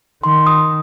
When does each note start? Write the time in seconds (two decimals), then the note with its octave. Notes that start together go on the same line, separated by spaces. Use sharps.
0.23 D#3 C6
0.47 D#6